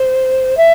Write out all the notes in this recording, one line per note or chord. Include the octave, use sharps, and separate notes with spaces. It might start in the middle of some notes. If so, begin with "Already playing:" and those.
Already playing: C5
E5